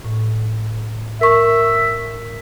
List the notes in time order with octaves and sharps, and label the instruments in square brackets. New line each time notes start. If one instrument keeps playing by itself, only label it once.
[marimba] A2
[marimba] A#4 C#6 [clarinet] E5